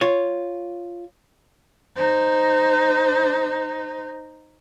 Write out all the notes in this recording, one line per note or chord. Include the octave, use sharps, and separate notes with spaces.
F4 C#5
D#4 C5